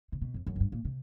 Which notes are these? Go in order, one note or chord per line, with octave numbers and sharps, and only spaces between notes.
C3
B2
F2
F#2
G#2
G2
A#2
C3